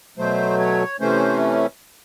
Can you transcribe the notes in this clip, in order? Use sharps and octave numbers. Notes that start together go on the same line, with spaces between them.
B2 F#3 A3 C5
C#5
C3 E3 A3 C#4 C5